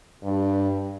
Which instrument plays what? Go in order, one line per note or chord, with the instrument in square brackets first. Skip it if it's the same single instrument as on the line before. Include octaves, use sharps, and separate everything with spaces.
[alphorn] G2